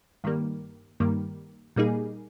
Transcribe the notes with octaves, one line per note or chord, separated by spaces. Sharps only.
G2 D#3 G3 A#3
G2 D#3 G3 A#3
A#2 G3 A#3 D#4 G#4